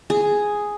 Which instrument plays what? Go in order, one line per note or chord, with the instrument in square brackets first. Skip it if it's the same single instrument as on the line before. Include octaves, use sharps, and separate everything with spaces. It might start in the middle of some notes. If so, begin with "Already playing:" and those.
[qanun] G#4